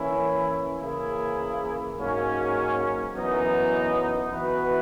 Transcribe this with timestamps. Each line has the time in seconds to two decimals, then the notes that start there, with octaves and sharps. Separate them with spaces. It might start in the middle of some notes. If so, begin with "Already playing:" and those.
Already playing: E3 A#3 C#4 E4
0.81 C#3 E3 A#3 E4 G#4
1.98 G#2 F#3 A#3 C#4
3.15 F#2 E3 B3 D#4
4.32 E3 B3 F#4 B4